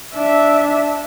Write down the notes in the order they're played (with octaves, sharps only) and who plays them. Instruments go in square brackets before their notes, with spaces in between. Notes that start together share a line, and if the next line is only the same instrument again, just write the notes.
[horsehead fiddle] D4 E5